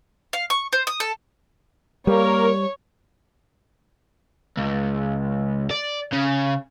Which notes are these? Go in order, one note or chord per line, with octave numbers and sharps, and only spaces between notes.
F5
C#6
C5
D#6
A4
G3 A#3 A#4 C#5
C#2
D5
C#3